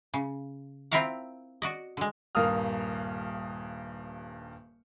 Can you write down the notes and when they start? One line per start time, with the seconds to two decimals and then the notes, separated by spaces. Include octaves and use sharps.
0.14 C#3
0.91 C4 E4 F4 A#4 F5 F#5
1.62 F#4 D5 D#5
1.97 D3 G#3
2.35 D#1 G2 A#4 F5 D#6 F6